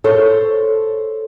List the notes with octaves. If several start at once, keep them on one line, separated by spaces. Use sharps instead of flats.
A4 C5 C#5